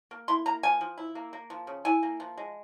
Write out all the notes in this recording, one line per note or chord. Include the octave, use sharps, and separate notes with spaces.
A#3
E4 C6
A#3 A#5
F3 G#5
F3
E4
A#3
A#3
F3
C#3
E4 G#5
A#3
F3
G#3